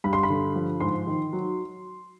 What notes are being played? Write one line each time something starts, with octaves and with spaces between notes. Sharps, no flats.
G2 B5
C6
B5
D3
F3
G#2 C6
D#3
F#3